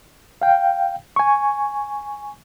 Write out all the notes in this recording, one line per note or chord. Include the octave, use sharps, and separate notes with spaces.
F5 G5
G#5 C#6